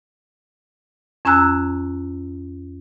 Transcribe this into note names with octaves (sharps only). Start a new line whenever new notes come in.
F2 C#4 G#5 A#5 E6 F#6